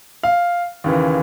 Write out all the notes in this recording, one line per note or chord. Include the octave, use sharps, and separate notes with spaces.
F5
D#2 C#3 E3